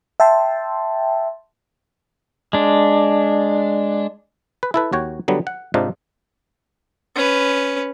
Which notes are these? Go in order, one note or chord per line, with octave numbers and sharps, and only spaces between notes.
E5 G5 A5 C6
G#3 D4
B4
E4 A4 B4
D#2 F#4 C#5 G5
D3 F#3 G3 B3
F#5
G#2 C3 D4 D#4 F4
C#4 B4